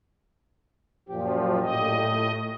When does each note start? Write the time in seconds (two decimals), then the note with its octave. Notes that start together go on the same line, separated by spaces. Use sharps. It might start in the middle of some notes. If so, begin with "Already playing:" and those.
1.09 F#2 A#2 F3 G4
1.62 A2 D#5